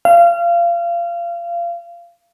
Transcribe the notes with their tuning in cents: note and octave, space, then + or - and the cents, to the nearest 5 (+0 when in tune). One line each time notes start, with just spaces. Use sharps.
F5 -25